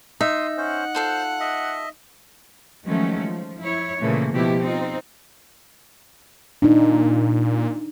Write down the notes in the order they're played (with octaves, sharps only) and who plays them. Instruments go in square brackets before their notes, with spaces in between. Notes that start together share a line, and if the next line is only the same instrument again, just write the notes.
[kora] D#4 [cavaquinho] E5 [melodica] C6 D#6
[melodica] C#4 C5 [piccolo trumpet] F#5
[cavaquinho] F4 A4 F5 [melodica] C5
[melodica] D#5 E5
[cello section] D#3 F3 F#3 G#3 A3 C#4
F3
E4 C#5
A#2 C#3 E3 A3 A#3
B2 F3 A3 E4 G4
C4 D#4 F4
[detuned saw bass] A#2 [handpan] D4 D#4